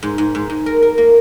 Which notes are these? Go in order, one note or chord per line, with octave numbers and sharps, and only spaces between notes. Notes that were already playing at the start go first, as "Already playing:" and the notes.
G#2
G#2
G#2
G#2
A#4
A#4
A#3